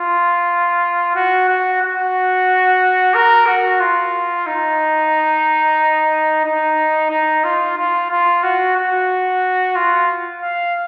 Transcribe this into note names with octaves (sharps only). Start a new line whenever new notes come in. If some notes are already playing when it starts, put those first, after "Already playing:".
Already playing: F4
F#4
F#4
F#4
A#4
F#4
F4
D#4
D#4
D#4
F4
F4
F4
F#4
F#4
F4
F5